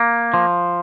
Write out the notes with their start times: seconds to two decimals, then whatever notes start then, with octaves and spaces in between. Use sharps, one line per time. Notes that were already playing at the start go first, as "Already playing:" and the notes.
Already playing: A#3
0.34 F3